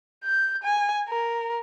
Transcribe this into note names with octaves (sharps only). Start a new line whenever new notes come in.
G6
G#5
A#4